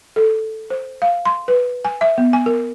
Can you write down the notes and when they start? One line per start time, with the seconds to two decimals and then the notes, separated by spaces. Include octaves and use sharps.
0.16 A4
0.70 C5
1.02 F5
1.25 C6
1.48 B4
1.85 G#5
2.01 E5
2.18 B3
2.33 G#5
2.46 A#4